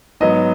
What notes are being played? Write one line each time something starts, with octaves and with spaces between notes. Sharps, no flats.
G#2 F#3 B3 D#5